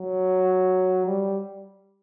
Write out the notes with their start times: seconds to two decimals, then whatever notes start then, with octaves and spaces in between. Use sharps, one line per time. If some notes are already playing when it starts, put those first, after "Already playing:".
Already playing: F#3
1.06 G3